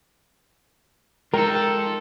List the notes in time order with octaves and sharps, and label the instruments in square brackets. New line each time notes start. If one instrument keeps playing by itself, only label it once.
[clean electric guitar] G#3 D#4 [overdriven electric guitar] F4 A4 [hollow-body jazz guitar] A#4 [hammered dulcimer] G5